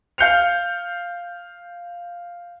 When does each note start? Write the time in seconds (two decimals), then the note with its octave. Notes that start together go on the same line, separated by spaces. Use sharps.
0.18 F5 F6 G6 C7 C#7 F7